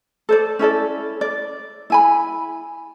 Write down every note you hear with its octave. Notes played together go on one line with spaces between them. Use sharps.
A4 C5 D5
C#4 E4 A4 D5
D5
E4 G#5 B5